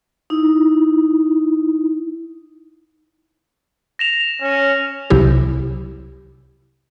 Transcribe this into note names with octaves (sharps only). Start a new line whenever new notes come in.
D#4 E4
A#6 E7 F7
C#4
C2 C3 F#3 E4 G4